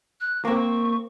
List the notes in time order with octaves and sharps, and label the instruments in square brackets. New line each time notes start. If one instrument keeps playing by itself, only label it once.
[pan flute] F#6
[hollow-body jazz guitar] A#3 C4 [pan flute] C#6